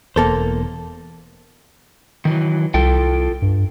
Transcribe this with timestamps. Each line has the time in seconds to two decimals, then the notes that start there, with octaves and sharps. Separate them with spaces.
0.16 E1 E2 A#3 A4 C5
2.25 D#3 E3 F#3
2.74 C2 F4 A4 G5
3.42 G2